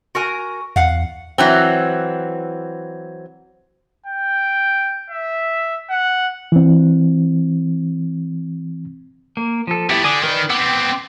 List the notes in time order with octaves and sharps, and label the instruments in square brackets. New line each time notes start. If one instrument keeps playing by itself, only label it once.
[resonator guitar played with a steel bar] F#4 A#4 G#5
[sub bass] E2 [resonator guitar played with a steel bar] F5 F#5
[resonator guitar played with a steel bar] E3 F#3 C4
[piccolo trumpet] G5
E5
F#5
[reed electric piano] E3 C4
[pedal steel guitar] A#3
F3 A4
[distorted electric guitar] A3 B3 [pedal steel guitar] E4 G4
[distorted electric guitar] D3 [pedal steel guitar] G#5 D6 D#6
[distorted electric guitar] D#3 [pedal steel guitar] A#4 B4 D5
[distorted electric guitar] B3 C4 [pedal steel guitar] G5 D6 E6